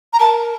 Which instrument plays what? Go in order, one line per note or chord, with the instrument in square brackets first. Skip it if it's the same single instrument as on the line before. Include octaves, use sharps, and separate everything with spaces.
[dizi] A#5
[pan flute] A#4 [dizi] A5